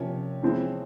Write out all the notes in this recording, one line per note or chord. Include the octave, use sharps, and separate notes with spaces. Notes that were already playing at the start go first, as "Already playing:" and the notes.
Already playing: C3 F3 A#3 C#4 C#5
F2 E3 G#3 C4